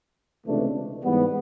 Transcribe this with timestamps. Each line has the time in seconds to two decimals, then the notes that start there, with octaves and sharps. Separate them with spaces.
0.45 C#2 C3 E3 A3 D4
1.03 G#2 E3 G3 B3